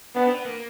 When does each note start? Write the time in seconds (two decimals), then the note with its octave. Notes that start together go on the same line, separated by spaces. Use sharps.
0.15 B3 D4
0.26 C4
0.35 B3
0.45 A#3